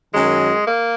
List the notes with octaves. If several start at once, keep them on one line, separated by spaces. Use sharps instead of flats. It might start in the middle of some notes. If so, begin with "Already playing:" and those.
F#2 D#3 F#3 G#3
A#3